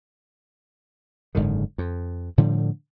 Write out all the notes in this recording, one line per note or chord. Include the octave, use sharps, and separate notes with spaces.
F#1 G#2 D3 D#3
F2
A2 D3 F3 G3